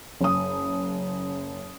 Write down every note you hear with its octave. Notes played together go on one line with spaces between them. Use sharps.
F#1 D#6